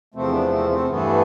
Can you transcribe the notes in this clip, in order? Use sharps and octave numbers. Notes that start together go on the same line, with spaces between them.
E2 C3 F3 A3 C4
B3 D4
A3 C4
A3 C4
G2 E3 A3 B3